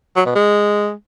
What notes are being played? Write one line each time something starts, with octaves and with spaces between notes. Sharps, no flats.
F#3
B2
G#3